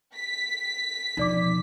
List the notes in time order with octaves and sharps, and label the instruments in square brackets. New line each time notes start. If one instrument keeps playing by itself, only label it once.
[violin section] B6
[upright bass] E1 F3 [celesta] D#4 D5 D6